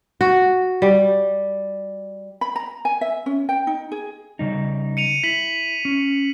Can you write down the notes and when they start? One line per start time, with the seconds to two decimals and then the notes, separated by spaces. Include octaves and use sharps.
0.21 F#4
0.82 G3
2.41 B5
2.56 A#5
2.85 G#5
3.01 E5
3.26 C#4
3.49 G5
3.67 D#4
3.92 G#4
4.39 C#3 G3 D#4
4.97 C#7 D#7 F7
5.23 E4 B6 F#7
5.85 C#4